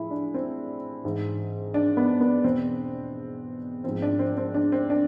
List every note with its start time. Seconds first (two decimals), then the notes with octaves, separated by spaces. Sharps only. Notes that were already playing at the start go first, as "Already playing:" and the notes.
Already playing: A2 F3 E4 G#4
0.11 D4
0.34 C4
1.04 G#2 E3
1.74 D4
1.97 B3
2.21 B3
2.44 E2 B2 C4
3.84 G#2 F3 C4
4.02 D4
4.19 C4
4.37 C4
4.54 D4
4.72 C4
4.90 D4